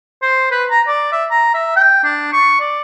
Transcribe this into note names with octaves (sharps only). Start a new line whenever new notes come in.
C5
B4
A#5
D5
E5
A#5
E5
G5
D4
C#6
D5